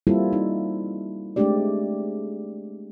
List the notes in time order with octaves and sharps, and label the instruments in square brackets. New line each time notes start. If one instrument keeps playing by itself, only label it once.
[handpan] G3 A#3 C4 E4 F4 A4
D#4
G#3 A3 C4 D4 G4 D5